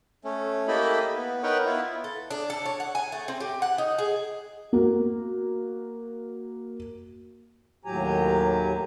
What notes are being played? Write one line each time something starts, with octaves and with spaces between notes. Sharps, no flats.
A3 C#4
A#3 E4 G4 A4 D#5 B5
B3
D#4 A#4 B4 C#5 F#5 G5
B3 E4 F4
A4
D4
A4
C#5
F#5
G#5
A3
C4
G4
F#5
D#4
G#4
A#3 F#4
D#2 A2 F#3 G4 G#5 A#5